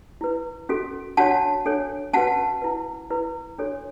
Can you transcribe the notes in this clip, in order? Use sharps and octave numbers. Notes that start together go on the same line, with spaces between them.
E4 B4
C#4 F#4 A4
D4 F#4 C#5 F#5 A5
D4 A4 C#5
C#4 F#4 B4 F#5 A5
E4 B4
E4 B4
D4 F#4 A4 C#5